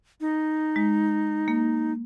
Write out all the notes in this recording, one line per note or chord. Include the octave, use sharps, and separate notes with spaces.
D#4
G#3
A#3